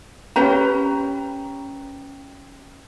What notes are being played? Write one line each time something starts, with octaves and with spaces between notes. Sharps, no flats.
C#4 G4 B4 A#5